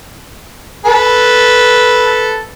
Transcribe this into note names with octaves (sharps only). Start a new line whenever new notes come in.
A4 B4